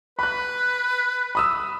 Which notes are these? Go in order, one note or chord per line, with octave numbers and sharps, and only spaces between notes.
B4 B5 F#6
B5 D#6 E6